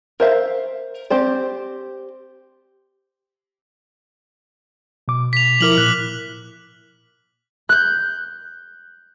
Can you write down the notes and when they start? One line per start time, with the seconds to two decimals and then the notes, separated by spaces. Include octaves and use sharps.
0.20 A#4 C5 E5 F5
1.10 C4 G4 C5 D5
5.08 B2 D6
5.33 B6 F7
5.61 F3 E4 A#4 D6 F6 F#7
5.78 A#2 F#6
7.69 F#6 G6